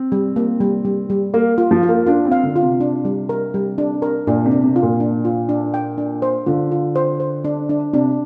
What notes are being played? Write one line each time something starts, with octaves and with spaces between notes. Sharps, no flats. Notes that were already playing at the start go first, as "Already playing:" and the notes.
Already playing: C4
G3
A#3
G3
G3
G3
A#3 F5
F4
F3
F4
A#3
D4 F4
C4
F5
D3
F4
C3
D4
G3
A#4
G3
D4
A#4
A#2 D4
C3
D4
C3
F4
A#2
D4
F4
D4
G5
D4
C5
D3 F4
F4
C5
C5
D4
D4
C3 D4